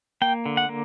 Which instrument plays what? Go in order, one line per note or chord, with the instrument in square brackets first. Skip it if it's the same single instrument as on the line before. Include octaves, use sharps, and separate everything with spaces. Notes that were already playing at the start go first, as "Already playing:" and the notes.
[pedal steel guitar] A#3 G5
D3
F#5
A#3